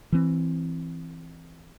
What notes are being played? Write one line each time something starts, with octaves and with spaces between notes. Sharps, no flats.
E3 C4